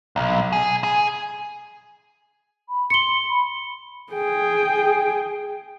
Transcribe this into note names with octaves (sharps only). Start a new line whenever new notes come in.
B1
G#4
G#4
B5
C6 C#7 G7
B5
G#4 G5